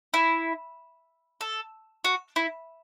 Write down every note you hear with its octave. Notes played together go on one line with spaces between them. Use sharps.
E4
A4
F#4
E4